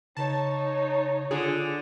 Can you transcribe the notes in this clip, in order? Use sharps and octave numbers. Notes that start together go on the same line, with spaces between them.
C#3 D#4 C#5 A5
D3 F4 G#4